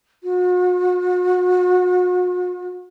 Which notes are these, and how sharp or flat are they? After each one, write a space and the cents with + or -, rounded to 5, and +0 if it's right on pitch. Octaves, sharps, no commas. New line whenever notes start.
F#4 -40